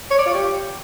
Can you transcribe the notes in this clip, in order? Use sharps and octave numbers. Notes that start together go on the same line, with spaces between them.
C#5
D5
F4
G4